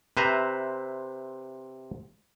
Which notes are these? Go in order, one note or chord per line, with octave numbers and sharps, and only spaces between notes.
C3 B4 C5 E5 A#5